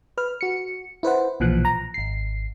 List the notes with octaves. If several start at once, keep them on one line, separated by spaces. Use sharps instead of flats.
B4 F6
F#4 C#7
E4 B4 C5 F#5
B1 A#2 E3 F3 F#6
A#5
G#1 C7